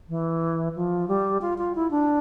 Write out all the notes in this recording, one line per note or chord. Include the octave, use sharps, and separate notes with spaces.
E3
F3
G3
F4
F4
E4
D4